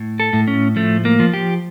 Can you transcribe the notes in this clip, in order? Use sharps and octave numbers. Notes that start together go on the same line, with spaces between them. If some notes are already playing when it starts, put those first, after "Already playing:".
Already playing: A2
A4
A2
C#4
F3 A3
A#3
F3
G4